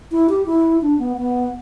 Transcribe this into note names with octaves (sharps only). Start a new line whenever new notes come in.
E4
G4
E4
D4
B3
B3